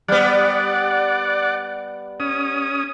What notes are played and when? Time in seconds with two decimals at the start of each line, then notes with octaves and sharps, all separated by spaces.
0.08 G3 B3 D5 F#5
2.20 C#4 D#6